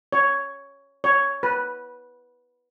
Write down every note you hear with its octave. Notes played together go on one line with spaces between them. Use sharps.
C#5
C#5
B4